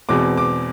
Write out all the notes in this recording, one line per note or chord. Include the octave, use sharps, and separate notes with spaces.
E2 B2 G#3 C4 D6
D6